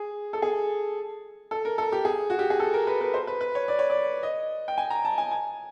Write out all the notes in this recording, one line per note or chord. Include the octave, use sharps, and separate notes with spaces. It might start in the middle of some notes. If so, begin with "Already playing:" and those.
Already playing: G#4
A4
G#4
A4
A#4
A4
G4
G#4
F#4
G4
G#4
A4
A#4
B4
B4
C5
B4
B4
C#5
D5
C#5
D5
D#5
G5
G#5
A#5
A5
G#5
G#5